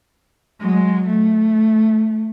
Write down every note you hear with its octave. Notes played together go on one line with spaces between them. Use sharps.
F#3 G#3
A3